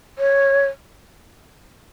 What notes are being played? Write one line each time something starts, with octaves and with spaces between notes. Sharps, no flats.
C#5